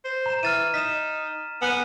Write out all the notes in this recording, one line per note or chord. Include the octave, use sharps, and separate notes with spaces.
C5
A#5 E7
E3 F6 A6 D#7
D#4 B6 E7
B3 G#5 F#6 D#7